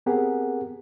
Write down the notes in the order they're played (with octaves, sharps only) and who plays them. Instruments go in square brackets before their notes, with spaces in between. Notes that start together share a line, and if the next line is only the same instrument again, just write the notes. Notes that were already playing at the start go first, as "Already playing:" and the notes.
[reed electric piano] B3 C4 G4 G#4 A#4 F#5